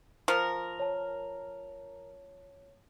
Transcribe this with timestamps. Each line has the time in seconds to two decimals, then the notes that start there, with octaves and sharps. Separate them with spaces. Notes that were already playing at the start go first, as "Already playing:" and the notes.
0.28 F3 A#4
0.79 C#5 A5